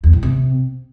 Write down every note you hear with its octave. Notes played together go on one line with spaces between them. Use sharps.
E2
A2
C3